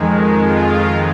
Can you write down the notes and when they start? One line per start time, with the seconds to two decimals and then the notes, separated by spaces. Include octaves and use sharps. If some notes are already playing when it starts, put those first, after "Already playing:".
Already playing: F2 D#3 G#3
0.41 F4